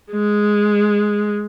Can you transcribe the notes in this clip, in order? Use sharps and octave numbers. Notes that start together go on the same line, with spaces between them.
G#3